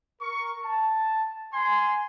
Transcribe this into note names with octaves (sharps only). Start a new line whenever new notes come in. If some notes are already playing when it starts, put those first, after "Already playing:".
A#4 C#6
A5
G#5 C6